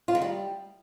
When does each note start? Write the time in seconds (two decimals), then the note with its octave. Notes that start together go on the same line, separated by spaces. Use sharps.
0.08 F4
0.15 D#3
0.22 G3